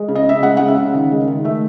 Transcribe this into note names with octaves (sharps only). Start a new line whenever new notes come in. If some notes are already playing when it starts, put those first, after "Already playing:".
Already playing: G#3
C#3
D#5
C#3 E5
G#3 F#5
C#3 F#5
E5
C#3
D#3
G#3
D#3
A3 E5